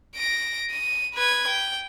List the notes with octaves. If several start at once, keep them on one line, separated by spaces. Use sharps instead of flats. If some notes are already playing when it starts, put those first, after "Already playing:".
A#6 D7
D#7
B4 G#6
G5